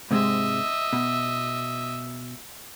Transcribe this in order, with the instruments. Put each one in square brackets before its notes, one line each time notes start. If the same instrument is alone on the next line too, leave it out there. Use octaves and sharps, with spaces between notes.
[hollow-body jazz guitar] G#2 C3 G#3 [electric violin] D#5 E5
[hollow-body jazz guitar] B2